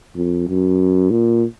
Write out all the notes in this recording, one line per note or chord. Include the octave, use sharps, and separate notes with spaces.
F2
F#2
A#2